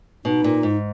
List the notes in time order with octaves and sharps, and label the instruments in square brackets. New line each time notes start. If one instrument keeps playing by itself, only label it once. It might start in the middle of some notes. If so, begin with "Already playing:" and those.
[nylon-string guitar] B2 [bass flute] D#4
[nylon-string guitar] A#2
G#2